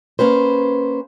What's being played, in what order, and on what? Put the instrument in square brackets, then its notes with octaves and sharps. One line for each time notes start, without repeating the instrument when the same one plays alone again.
[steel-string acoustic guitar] A#3 C#4 B4 C5